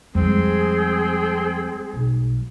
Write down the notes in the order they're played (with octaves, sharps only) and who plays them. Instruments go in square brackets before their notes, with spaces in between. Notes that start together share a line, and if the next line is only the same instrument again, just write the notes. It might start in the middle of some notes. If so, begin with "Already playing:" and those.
[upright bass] F2 [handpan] G3 G#3 [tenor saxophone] C4 [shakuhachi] G#4
[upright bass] B1